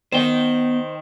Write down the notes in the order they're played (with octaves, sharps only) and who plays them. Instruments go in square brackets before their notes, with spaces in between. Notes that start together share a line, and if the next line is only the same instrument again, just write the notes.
[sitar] D#3 [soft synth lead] B3 [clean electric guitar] C5 G5